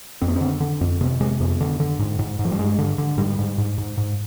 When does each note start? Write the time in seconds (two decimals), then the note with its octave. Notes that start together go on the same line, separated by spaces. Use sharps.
0.22 F2 C4
0.28 B3
0.36 D3 C4
0.60 D3
0.81 F2 C4
1.01 C3 B3
1.20 C3 G#3
1.40 F2 B3
1.61 D3
1.80 D3
1.99 G#2
2.19 G#2
2.39 G#2
2.45 F3
2.52 G3
2.59 G2 G#3
2.78 D3
2.98 D3
3.17 G#2 G3
3.39 G#2
3.58 G#2
3.78 G#2
3.98 G#2